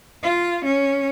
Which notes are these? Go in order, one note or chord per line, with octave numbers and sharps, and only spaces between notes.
F4
C#4